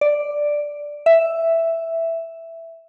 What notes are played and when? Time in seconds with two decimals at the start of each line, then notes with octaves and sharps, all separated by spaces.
0.01 D5
1.06 E5